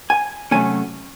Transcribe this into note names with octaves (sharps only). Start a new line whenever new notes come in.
G#5
C3 D#3 F#3 A3 C#4 G#5